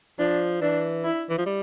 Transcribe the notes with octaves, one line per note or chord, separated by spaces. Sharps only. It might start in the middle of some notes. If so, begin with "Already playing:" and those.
F3 D4
E3 D4
E4
E3
F3
G3